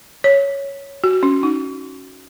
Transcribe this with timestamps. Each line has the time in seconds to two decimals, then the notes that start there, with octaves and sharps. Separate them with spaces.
0.24 C#5
1.04 F#4
1.23 C#4
1.43 D#4